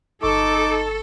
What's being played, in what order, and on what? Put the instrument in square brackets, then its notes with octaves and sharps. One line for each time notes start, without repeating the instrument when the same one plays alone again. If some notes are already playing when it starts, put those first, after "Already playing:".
[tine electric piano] G1 C#6 [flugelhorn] D#4 [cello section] A4 [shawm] D6